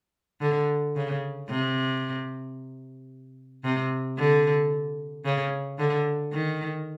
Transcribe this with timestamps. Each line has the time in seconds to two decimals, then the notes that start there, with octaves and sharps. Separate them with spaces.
0.41 D3
0.96 C#3
1.49 C3
3.64 C3
4.18 D3
5.25 C#3
5.79 D3
6.33 D#3